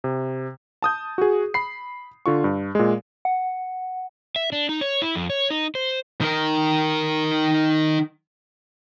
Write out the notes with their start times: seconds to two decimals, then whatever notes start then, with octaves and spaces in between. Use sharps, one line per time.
0.04 C3
0.82 A5 D#6 G6
1.18 F#4 G#4
1.54 B5 C7
2.26 D3 F4 C#6
2.44 G2
2.75 A#2 G#3
3.25 F#5
4.36 E5
4.52 D4
4.69 D#4
4.81 C#5
5.02 E4
5.15 F2
5.30 C#5
5.50 D#4
5.75 C5
6.21 D#3 A#4